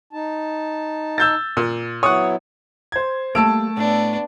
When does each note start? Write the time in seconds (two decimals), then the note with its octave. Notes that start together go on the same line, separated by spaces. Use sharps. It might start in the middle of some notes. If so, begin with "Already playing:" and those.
0.13 D#4 A5
1.18 E6 G6 A6
1.57 A#2
2.03 F#3 B3 E4 C#5 F#5 D#6
2.92 C5 G#6
3.35 G3 A3 A#3 A5 E6 D7
3.77 A2 B3 D4